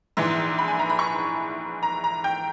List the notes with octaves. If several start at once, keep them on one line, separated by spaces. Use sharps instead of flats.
A#1 G#2 E3
B5
G#5
A#5
B5
C#6
A#5
A#5
G5